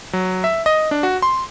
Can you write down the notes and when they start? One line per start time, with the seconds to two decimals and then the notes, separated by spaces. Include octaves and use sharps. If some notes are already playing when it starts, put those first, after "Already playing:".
0.13 F#3
0.44 E5
0.66 D#5
0.91 D4
1.03 F#4
1.22 C6